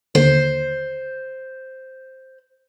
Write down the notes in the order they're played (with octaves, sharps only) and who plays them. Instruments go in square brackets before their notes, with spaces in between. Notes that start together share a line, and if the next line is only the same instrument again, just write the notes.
[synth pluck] D#2 D3 [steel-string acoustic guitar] C5